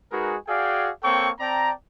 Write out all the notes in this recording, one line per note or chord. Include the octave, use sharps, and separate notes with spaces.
G#3 D#4 F#4 G#4 A#4 B4
F#4 G#4 D5 F5 G5 G#5
A#3 C4 A4 C#5 G5 C#6
C4 D5 G5 A5 A#5